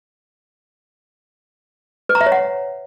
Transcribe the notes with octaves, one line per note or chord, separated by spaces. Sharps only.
B4
A#5
E5
C#5
F#5